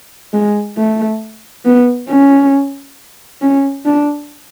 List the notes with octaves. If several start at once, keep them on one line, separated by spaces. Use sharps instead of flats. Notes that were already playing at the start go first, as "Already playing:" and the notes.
G#3
A3
B3
C#4
C#4
D4